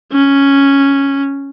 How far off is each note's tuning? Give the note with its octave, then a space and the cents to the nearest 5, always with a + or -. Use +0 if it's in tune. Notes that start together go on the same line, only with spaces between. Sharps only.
C#4 +0